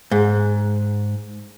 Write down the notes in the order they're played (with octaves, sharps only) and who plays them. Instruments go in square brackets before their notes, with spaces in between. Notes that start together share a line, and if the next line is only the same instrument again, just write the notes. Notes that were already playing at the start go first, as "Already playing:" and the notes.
[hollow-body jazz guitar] G#2